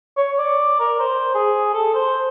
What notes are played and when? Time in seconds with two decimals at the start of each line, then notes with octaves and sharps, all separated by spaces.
0.17 C#5
0.39 D5
0.80 A#4
1.00 C5
1.35 G#4
1.74 A4
1.95 C5